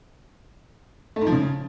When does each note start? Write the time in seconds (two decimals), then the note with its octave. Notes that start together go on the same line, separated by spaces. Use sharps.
1.16 A3
1.21 G#2
1.27 F3
1.32 C#3